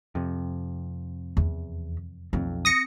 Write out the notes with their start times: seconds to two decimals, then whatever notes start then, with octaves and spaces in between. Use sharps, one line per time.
0.15 F2 C3
1.37 E2
2.33 B1 F2 C4
2.65 D#6 A#6 C#7